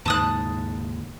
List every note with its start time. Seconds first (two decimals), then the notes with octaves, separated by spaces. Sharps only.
0.06 D#2 G#2 C#3 A5 D#6 F#6